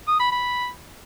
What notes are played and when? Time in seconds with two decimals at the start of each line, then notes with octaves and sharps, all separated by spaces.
0.08 D#6
0.20 B5
0.32 B5